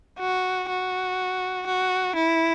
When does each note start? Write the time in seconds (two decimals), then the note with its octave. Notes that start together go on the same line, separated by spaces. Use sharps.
0.20 F#4
0.69 F#4
1.67 F#4
2.16 E4